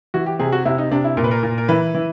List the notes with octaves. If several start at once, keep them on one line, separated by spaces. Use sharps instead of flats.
E3 F#4
G4
C3 G#4
F#4
C3 E4
D#4
C3 D4
E4
A#2 A#4
B4
A#4
A#2
A#4
E3 B4
E3